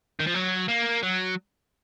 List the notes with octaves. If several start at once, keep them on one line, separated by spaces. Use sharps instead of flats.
D#3
F3
F#3
A#3
F#3